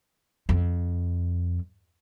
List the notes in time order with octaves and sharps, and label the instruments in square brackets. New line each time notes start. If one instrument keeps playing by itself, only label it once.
[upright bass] F2